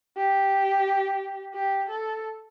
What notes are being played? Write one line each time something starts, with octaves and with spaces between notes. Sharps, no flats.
G4
G4
A4